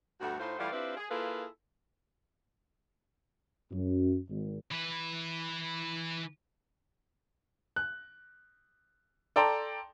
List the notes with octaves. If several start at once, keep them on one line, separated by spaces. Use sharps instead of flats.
D2 G2 A3 F#4
A2 D#4 F4 C5
E3 G3 A3 F4 D5 F#5
C4 D4 E4 F4 G4 B4
G#4
A#3 E4 F4 G#4 A4 B4
F#2
G#1
E3 B4
F#6
A4 D5 G5 A5 A#5 C6